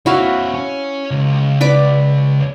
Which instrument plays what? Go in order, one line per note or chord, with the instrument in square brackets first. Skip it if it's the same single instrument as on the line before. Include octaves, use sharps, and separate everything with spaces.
[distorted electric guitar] C4 C#5 [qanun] E4 F#4 F5
[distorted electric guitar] C#4
C#2
[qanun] B4 D5 D6